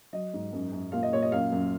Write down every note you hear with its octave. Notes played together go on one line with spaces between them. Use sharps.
F#3 D#5
G#2
F#2
F#2
A#2 F5
D#5
A#2 C#5
D#5
F#2 F5
F#2